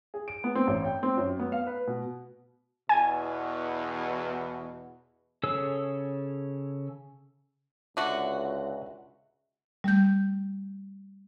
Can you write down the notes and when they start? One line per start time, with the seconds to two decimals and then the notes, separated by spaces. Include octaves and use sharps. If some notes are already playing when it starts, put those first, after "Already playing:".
0.14 G#4
0.28 D7
0.44 B3
0.55 C4
0.67 A1
0.85 G5
1.03 C4
1.18 F#2
1.40 B3
1.52 F5
1.67 B4
1.87 B2
2.89 E2 B2 G#5
5.43 C#3 G#4 A4 C#5 E6
7.97 C#2 D3 F#4 E5
9.84 G3 A3 G6